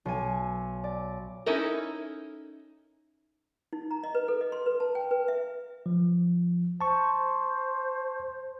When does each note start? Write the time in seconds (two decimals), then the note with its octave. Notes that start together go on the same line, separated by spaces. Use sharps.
0.05 B1 G#5
0.84 D5
1.46 C#4 D#4 E4 A4 A#4
3.73 D#4
3.91 A#5
4.04 D#5
4.15 B4
4.28 A4
4.41 D#5
4.52 C6
4.66 B4
4.80 A5
4.95 G5
5.11 B4
5.28 E5
5.86 F3
6.81 C5 A5 C#6